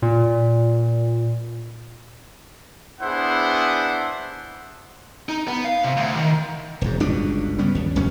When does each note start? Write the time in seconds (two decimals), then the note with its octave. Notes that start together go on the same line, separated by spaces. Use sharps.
0.02 A#2
3.01 B3 D4 E4 G#4 C5 F#5
5.29 D#4
5.47 B3
5.65 F5
5.84 C3
5.97 D2
6.16 D#3
6.81 E1 G#2
7.00 G1 C#2 B2 D4
7.58 G3 B3 C#4
7.75 D#2
7.95 D1 F#2 C#3 C#4